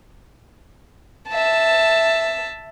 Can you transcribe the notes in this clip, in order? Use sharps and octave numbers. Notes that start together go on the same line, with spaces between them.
E5 A5